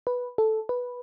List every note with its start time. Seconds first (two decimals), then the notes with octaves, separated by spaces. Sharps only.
0.07 B4
0.38 A4
0.69 B4